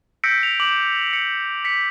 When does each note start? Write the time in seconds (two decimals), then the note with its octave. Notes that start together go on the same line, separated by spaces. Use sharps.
0.24 E6 G6 A#6 B6 C#7 D7
0.43 F7
0.60 D6 F#7
1.13 C#7
1.65 B6 C#7